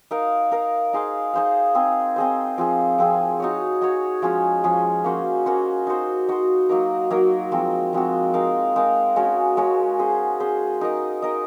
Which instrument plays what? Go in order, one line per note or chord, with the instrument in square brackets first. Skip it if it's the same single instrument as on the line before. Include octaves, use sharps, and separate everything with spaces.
[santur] D#4 A#4 F5
D#4 A#4 F5
D#4 G#4 C5 F5
D#4 G#4 C5 F5
C4 D#4 G#4 C5
C4 D#4 G#4 C5
F3 C4 F4 G#4
F3 C4 F4 G#4
D#4 F#4 C#5
D#4 F#4 C#5
F3 G#3 C#4 G#4
F3 G#3 C#4 G#4
A#3 C#4 F#4 C5
A#3 C#4 F#4 C5
D#4 F#4 C5
D#4 F#4 C5
F#3 A#3 D#4 A#4
F#3 A#3 D#4 A#4
F3 G#3 C4 F#4
F3 G#3 C4 F#4
G#3 D#4 A#4 F5
G#3 D#4 A#4 F5
G#3 C#4 F#4 C#5
G#3 C#4 F#4 C#5
C#4 G#4 C5
C#4 G#4 C5
D#4 A#4 D#5
D#4 A#4 D#5